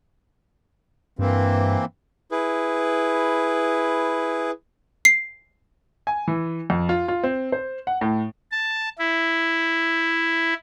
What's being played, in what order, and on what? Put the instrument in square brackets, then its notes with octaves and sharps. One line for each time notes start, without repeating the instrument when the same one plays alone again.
[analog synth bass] G2 [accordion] E3 A#3 C4
[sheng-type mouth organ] E4 G#4 B4
[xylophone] C7
[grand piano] G#5
E3
F2
F4
F4
C4
C5
F#5
A2
[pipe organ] A5
E4